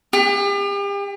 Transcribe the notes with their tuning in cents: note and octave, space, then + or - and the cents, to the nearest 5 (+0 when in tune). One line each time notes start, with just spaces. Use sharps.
G4 +40